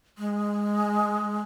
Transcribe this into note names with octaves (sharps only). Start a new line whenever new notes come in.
G#3